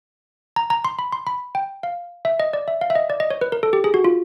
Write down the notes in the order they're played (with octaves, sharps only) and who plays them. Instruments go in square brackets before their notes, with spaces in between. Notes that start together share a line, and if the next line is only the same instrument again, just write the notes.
[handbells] A#5
A#5
C6
B5
C6
B5
G5
F5
E5
D#5
D5
E5
F5
E5
D#5
D5
D#5
C#5
B4
A#4
A4
G4
G#4
F#4
F4